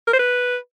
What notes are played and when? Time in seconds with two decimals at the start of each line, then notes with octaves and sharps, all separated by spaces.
0.08 A#4
0.13 C5
0.19 B4